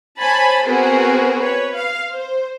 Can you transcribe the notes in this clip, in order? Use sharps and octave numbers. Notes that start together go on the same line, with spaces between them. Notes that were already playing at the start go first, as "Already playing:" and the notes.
C5 C#5 G#5 A5 B5
B3 C4 F#4 G#4 A#4 B4
B4 C#5
F5
C5